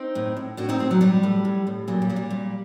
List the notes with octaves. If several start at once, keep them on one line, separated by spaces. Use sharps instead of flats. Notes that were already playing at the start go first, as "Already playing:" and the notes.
Already playing: C4 D#4
A2
A2
A2 D4 F#4
C4 D#4
A2 C4 D#4
F#3
A2 G3
A2
A2
A2
A#2 F#3
G3
A#2 F#3
G3
A#2